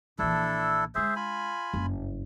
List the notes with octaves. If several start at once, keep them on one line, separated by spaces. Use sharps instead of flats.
A#1 E3 D4 E4 A4
G#3 D4 G#4 C5 E5
F4 G#5 B5
F#1 G2